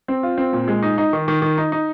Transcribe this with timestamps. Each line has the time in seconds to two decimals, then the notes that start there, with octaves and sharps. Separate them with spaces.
0.08 C4
0.23 F4
0.38 C4
0.53 A#2
0.68 G#3
0.82 D#4
0.98 D#4
1.13 D#3
1.28 D#3
1.42 D#3
1.58 D#4
1.72 D#4